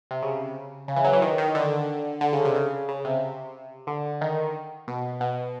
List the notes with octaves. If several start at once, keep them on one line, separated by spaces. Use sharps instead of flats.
C3
C#3
C#3
E3
F#3
E3
D#3
D#3
D3
D3
C#3
C3
C#3
C#3
C3
D3
D#3
B2
B2